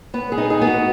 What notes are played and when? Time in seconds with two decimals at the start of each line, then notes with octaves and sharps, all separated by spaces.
0.14 B3 B4
0.32 G#4
0.38 D#4
0.50 G#4
0.61 B3
0.67 F#4